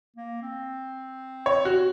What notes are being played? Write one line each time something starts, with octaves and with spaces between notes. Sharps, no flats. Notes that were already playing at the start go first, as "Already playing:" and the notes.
A#3
C4
C#5
F#4